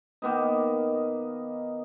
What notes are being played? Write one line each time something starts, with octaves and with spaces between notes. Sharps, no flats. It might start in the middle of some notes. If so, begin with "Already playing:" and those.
D#3 A#3 B3 D#4